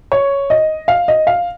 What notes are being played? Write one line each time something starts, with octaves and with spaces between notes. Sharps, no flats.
C#5
D#5
F5
D#5
F5